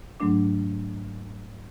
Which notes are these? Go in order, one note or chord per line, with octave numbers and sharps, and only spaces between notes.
G#2 F#3 A3 D4 D6